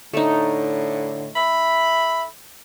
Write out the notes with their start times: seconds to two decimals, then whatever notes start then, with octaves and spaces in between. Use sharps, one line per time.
0.13 A2 D3 A3 D#4
1.36 E5 B5